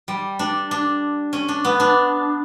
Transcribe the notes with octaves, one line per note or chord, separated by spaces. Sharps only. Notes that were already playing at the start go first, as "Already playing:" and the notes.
G3
D4
D4
C#4
D4
B3
D4